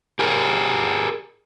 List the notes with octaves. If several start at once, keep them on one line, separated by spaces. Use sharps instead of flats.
G4 G#4 A#4